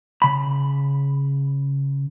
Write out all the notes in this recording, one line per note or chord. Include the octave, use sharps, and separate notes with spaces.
C#3 B5